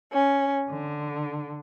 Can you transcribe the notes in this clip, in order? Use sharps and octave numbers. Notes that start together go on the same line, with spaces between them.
C#4
D3